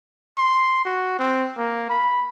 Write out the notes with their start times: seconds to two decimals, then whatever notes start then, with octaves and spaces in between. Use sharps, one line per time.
0.38 C6
0.85 F#4
1.19 C4
1.58 A#3
1.89 B5